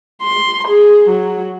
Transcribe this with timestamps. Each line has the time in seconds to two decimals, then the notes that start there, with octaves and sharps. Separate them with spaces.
0.22 C6
0.68 G#4
1.09 F#3